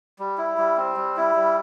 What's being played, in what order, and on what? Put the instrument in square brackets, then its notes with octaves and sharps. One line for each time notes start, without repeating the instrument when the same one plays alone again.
[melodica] G3
E4
G3
C4
G3
E4
G3